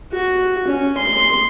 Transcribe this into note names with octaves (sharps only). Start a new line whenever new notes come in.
F#4
C#4
C6